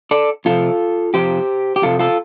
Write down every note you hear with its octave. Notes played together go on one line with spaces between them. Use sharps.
A4 D5
F2 C3 F3 F4 A4
F2 C3 F3 G4 C5
G4
F2 C3 F3 F4 A4
F4 A4